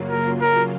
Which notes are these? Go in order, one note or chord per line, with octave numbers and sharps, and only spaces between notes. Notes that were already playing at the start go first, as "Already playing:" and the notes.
Already playing: F#2 C#3 F#3 A#3 F4
A#4
A#4